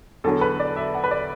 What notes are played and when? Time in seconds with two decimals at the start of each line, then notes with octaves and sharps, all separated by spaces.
0.24 E2 D3 F#3 A4
0.41 B4
0.60 D5
0.76 E5
0.94 F#5
1.04 B4
1.11 D5